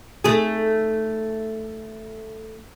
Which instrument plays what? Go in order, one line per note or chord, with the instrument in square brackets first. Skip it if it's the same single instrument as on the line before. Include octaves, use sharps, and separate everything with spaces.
[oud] A3 D#4 G#4